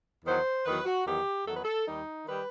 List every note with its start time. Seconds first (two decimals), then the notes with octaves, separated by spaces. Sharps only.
0.25 E2 D#3 F#3 C5
0.65 E2 D#3 F#3 B4
0.85 F#4
1.05 E2 D#3 F#3 G4
1.46 E2 D#3 F#3 A4
1.55 B4
1.64 A4
1.86 D#2 D#3 G3 D#4
2.27 D#3 G3 B4